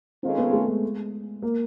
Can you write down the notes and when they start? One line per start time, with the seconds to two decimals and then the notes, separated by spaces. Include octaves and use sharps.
0.23 D#3 G#3 C4 C#4 F4 A4
0.38 B3
0.53 A3
0.68 G#3
1.42 A#3